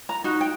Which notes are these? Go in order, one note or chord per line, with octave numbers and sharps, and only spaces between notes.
A#5
D#4 F#4
G5